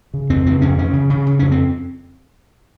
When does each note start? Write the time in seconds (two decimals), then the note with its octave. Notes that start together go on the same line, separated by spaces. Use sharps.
0.14 C#3
0.30 F2 C4
0.46 C#3 C4
0.61 F2 C#4
0.77 C#3 C#4
0.93 C#3
1.10 C#3
1.26 C#3
1.39 F2 C#4
1.51 C4